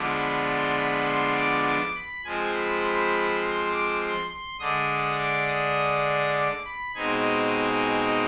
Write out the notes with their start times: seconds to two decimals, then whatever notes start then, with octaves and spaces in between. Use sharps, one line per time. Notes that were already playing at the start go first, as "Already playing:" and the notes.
Already playing: D3 F3 G#3 B3 D4
0.19 B5
0.49 C6
0.78 B5
1.07 C6
1.36 D6
1.66 D6
1.96 B5
2.25 F3 G#3 C4 G#5
2.54 B5
2.84 B5
3.43 C6
3.71 D6
4.01 C6
4.30 C6
4.59 D3 G#3 D4 D#6
5.19 D6
5.48 D#6
6.36 D6
6.65 B5
6.95 B2 G#3 C4 D#4 G#5